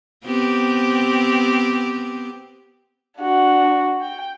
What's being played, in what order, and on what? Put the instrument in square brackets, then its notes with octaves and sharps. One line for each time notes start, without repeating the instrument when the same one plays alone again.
[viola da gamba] B3 C4 G4
[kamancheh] D4 F#4
G5